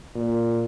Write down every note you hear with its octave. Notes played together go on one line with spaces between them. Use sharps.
A#2